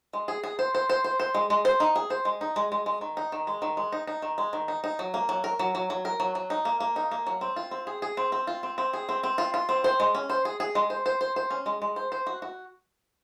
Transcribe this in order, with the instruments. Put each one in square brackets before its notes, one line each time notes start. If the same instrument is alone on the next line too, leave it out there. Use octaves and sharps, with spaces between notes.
[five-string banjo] G#3
G#4
G#4
C5
C5
C5
C5
C5
G#3
G#3
C5
D#4
G#4
C5
G#3
D#4
G#3
G#3
G#3
D#3
D#4
D#3
G#3
D#3
G#3
D#4
D#4
D#3
G#3
D#3
D#4
D#4
F#3
A#3
F#3
A#4
F#3
F#3
F#3
A#4
F#3
F#3
D#4
A#3
A#3
D#4
A#3
F#3
C4
F4
C4
G#4
G#4
C4
C4
F4
C4
C4
G#4
C4
C4
F4
F4
C4
C5
G#3
C#4
C5
G#4
G#4
G#3
C5
C5
C5
C5
C#4
G#3
G#3
C5
C5
F#4
F#4